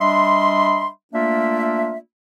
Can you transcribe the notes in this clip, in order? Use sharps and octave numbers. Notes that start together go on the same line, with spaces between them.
G3 D4 D#5 E5 B5 C6
A3 A#3 D4 F4 D5 E5